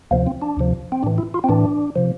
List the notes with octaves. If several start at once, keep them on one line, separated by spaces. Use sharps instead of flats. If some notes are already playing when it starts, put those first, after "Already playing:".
D2 C3 F3 A#3
C4
D4
D2 C3 F3
C4
A2 E3 D4
E4
F4
C4
A2 E3 D4
C3 F3